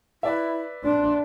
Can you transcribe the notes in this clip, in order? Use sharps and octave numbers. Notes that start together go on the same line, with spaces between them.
E4 B4 D5 E5
D4 C6